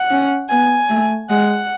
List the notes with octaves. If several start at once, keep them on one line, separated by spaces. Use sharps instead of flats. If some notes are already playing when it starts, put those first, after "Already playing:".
Already playing: F#5
C#4
B3 G#5
A3
G#3 F#5